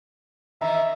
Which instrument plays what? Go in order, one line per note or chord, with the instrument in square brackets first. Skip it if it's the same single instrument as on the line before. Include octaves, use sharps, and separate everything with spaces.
[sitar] B2 D#3 E3 [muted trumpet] E5 [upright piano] A#5